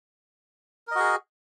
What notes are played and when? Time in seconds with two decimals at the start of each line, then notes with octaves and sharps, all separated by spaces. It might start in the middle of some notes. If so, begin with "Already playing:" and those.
0.87 A#4
0.91 D#5
0.95 F#4
1.00 G#4